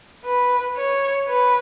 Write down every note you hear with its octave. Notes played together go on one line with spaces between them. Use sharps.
B4
C#5
B4